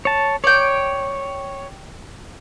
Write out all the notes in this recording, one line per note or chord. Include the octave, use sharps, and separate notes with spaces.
C#5 A5
C#5 D5 G5